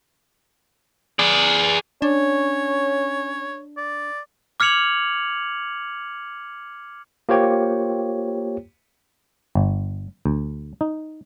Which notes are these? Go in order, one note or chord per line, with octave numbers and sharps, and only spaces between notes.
G#4 D5
C#4 D4 C#5
D5
D6 F6 G#6 C#7 F7 F#7
A#3 F4 G4 C5 C#5 G5
G1
D2
D#4